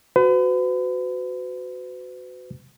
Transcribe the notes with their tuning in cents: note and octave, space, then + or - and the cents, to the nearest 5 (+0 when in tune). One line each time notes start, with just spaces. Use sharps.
F#4 -5 B4 +40